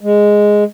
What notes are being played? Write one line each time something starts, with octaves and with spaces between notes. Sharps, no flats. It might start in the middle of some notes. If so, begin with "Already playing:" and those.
G#3